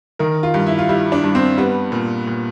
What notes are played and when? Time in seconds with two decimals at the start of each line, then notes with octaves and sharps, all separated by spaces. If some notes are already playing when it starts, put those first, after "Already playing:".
0.19 D#3 A#4
0.43 F4
0.54 G2
0.66 E4
0.79 F4
0.89 G3 E4
1.12 D4
1.24 G2
1.35 C4
1.58 G3 B3
1.92 A#2
2.27 A#2